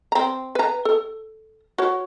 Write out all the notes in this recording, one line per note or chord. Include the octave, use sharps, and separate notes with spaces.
C4 A#5
B4 A#5
A4
F#4 C#5